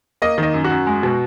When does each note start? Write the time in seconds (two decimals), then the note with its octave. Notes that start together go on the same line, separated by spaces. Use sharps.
0.22 A#3 D#5
0.38 D#3 D#5
0.54 F#2
0.64 F#4
0.71 F#2
0.87 G#3
1.03 B2